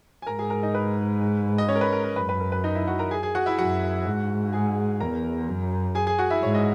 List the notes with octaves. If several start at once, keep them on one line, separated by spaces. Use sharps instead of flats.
G#5
G#2 A#4 A#5
G#4 G#5
A#4 A#5
D#4 D#5
B4
D#5
C#4 C#5
A#4
B4
A#4
A#4
F#2 B4
B4
A#4
B4
D#4 D#5
E4 E5
F#4 F#5
A#4 A#5
G#4 G#5
G#4 G#5
F#4 F#5
E4 E5
F#2 F#4 F#5
G#2
G#4 G#5
E2 A#4 A#5
F#2
G#4 G#5
G#4 G#5
F#4 F#5
E4 E5
G#2 C#5
D#5